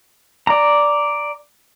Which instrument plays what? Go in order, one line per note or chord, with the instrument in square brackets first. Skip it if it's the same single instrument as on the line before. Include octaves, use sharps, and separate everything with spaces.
[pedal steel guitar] D5 A#5